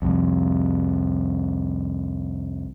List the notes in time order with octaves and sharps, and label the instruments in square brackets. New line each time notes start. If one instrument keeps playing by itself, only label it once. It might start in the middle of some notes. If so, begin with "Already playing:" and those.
[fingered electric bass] C2 F2